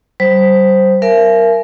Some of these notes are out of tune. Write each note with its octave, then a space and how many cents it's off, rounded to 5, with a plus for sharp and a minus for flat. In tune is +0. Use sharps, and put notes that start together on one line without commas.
G3 -35 C5 +0
A#4 +0 E5 +40 G#5 +40